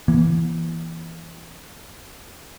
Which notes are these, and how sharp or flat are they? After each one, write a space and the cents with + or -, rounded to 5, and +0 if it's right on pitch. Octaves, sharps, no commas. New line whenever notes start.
E3 +5 A#3 +45